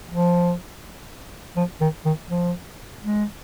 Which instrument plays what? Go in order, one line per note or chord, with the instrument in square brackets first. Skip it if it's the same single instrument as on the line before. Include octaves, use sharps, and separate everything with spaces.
[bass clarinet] F3
F3
D#3
D#3
F3
G#3